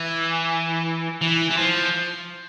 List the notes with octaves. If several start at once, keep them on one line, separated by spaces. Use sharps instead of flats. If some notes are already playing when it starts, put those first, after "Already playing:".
Already playing: E3
E3
E3
F3